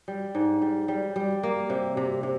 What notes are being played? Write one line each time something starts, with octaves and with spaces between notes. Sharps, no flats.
G3
G#2
G3
G3
G3
A#3
C3
C3
C3